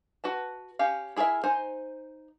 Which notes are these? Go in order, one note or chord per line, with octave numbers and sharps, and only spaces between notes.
F#4 B4 A5
C#4 G4 F5
E4 G#4 A#4 C5 E5
D#4 C5 G#5